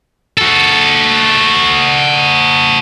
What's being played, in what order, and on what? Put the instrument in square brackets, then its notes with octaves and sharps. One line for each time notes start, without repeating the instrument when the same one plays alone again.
[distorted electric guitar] F#4 A4